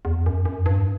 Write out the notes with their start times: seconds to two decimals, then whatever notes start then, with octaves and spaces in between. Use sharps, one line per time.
0.05 E2
0.26 F#2
0.45 F#2
0.66 G2